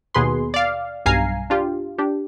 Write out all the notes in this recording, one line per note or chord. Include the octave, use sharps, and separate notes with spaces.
D#2 B2 G#4 B4 C6
D5 F5
B1 G2 F5 G#5 A#5 C7
D4 F4 G4
D4 G4